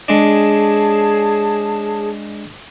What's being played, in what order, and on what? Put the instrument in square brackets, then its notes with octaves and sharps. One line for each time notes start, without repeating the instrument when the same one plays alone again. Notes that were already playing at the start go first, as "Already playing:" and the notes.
[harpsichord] G#3 D4 [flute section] G#4 C#5 A5